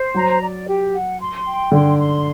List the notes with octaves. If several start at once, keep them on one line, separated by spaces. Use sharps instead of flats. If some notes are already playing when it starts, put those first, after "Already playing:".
Already playing: C5
F#3 A#5
D5
G4
F#5
C6
G5
D3 C6
C6